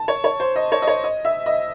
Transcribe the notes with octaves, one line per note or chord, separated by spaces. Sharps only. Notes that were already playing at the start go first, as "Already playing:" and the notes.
Already playing: A5
C#5
C#5
C5
D#5
C#5
D#5
C#5
D#5
E5
D#5